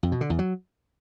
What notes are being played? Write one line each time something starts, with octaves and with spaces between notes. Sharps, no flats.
F2
B2
D3
E2
F#3